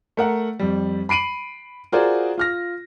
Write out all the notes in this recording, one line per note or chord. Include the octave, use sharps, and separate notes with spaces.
A3 A#4 F#5
F2 G3
B5 C7 D7 D#7 F#7
F4 F#4 G#4 A#4 C5 D5
F4 F6 A#6